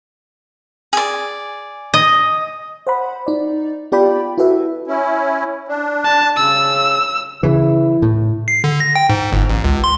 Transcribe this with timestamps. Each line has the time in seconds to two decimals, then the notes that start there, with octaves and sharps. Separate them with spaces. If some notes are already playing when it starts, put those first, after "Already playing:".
0.93 G#4 D5
1.94 D#5
2.87 C5 F#5 B5
3.27 D#4 D5
3.92 B3 F4 G4 D5 G5 B5
4.38 E4 F#4 A4 B4 E5
4.88 C#4 E4
5.68 D4
6.05 A5
6.36 C#3 E6
7.43 C#3 E3 E4
8.02 A2
8.48 C7
8.64 D3
8.80 A#6
8.96 G5
9.10 G#2
9.32 G1
9.50 A1
9.64 C#2
9.84 C6